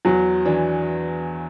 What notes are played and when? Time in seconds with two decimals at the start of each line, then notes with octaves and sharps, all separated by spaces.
0.05 E2 F#3
0.45 E3 D4